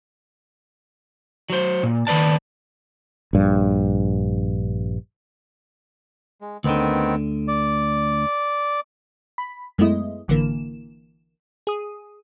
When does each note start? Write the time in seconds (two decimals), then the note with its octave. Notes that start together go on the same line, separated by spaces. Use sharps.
1.50 F#3 C5
1.83 A#2
2.07 D#3 E3 B4 D5 A5
3.33 A#1 G2
6.41 G#3
6.64 D2 D3 D#3 B3 C4
7.48 D5
9.38 B5
9.78 F#2 G#3 A3 B3 E4 D#5
10.28 A1 D3 E3 A#3 E7
11.67 G#4 D#6